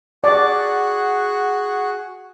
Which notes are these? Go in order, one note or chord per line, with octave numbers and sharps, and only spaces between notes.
F#4 G#4 D5 F#5